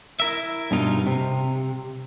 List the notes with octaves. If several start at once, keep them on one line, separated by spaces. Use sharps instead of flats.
E4 A#4 E5
G2 B2 D#4 F4
C3